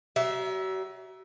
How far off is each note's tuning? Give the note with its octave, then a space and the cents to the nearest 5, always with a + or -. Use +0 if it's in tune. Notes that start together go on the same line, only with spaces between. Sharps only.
F#3 +40 E5 +0